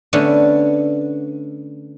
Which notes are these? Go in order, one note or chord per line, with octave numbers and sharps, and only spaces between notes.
D3 A3 B3 C#4 D4